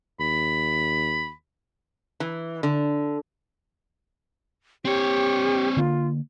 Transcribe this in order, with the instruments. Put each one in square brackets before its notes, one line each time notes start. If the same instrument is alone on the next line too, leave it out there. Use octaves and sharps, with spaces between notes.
[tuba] D#2 [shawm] B5
[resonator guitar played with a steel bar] E3
D3
[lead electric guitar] C4 C#5 [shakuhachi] G4
[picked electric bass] D3 A#3 [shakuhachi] F4